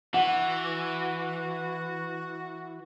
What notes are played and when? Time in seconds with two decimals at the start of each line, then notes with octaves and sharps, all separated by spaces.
0.14 E3 F#4 F#5